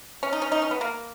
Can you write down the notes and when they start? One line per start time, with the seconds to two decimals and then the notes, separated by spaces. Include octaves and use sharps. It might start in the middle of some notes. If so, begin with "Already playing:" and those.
0.23 C#4
0.33 D#4
0.42 C#4
0.52 D#4
0.62 C#4
0.71 B3
0.81 A#3